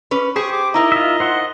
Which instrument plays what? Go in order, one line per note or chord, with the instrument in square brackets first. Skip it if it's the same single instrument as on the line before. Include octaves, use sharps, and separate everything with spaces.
[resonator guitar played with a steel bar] C#4 B4
[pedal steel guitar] G4 C5 [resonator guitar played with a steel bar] G#4 [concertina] C#6 D#6
[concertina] D6
[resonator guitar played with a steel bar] D#4 E4 A#4 [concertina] D#5
[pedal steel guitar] F4 E5
C5 F#5 C6